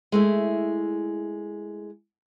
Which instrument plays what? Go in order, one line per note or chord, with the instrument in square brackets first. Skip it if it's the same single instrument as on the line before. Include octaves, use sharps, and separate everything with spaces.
[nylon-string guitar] G#3 A3 E4